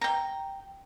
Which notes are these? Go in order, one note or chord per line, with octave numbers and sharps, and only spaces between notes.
G5 A#5